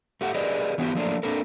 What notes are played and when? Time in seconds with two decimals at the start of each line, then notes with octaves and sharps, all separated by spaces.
0.21 A3 G4 F#5
0.35 G4 G#4 A#4 B4 D5 D#5
0.78 E3 B3 C#4 E4 F#4 G4
0.95 F3 F#3 A3 A#3 D4
1.23 A#3 C4 D4 A4 A#4